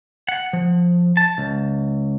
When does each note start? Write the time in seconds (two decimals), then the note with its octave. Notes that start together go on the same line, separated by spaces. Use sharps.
0.29 F#5
0.53 F3
1.17 A5
1.38 C#2